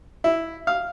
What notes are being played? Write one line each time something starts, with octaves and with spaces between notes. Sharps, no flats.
E4
F5